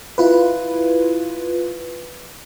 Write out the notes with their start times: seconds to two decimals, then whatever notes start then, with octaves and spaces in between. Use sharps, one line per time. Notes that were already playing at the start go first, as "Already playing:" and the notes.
0.18 E4 F4 B4